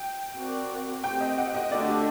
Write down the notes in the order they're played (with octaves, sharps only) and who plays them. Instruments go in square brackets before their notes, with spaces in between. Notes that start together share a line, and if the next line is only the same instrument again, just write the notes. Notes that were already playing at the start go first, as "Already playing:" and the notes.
Already playing: [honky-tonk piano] G5
[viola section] C4 F#4 A#4 D5
[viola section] A3 C4 G4 [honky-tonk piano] G5
[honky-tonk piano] D#5
F#5
D#5
[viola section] D3 A3 D4 F#4 [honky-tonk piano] D5
[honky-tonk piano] G4